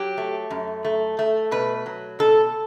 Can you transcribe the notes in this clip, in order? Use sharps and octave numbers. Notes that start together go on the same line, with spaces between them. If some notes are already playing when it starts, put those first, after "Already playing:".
Already playing: F#3 G4
A3
F#2
A3
A3
B2 B4
F#3
B2 A4